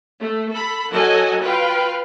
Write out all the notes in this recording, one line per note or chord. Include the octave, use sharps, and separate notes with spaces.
A3
A4 B5
F#3 A4 D#5 F#5 G#5
F4 B4 F5 G5